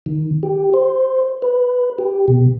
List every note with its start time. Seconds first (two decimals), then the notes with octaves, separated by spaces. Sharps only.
0.06 D#3
0.43 G4
0.74 C5
1.42 B4
1.98 G4
2.28 B2